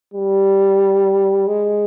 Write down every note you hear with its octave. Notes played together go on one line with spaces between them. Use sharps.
G3
G#3